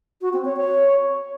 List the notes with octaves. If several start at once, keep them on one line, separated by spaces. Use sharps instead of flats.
F#4
C4
C#5
C#5